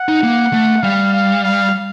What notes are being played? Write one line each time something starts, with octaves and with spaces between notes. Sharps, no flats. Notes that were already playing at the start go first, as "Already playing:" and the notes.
Already playing: F#5
D#4
A#3
A3
G3 F5
F5
F5